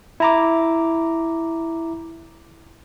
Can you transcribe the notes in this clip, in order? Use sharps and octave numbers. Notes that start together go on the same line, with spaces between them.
E4 A#5 D6